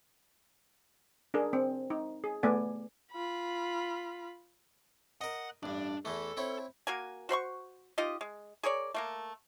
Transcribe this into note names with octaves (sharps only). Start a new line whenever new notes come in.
D4 G#4 A#4
C4
D#4
G#4
A3 B3 D5 G#5
F4 B5
A#4 D#5 F#5
A1 G2 D4
E2 E3 A3 A4
C4 E4 C#5
A#3 F#4 A#4 G#5
F#4 C5 B5 C#6
D#4 F4 G4 D#5
G#3
G#4 A#4 C#5 D5
A3 A#3 A#4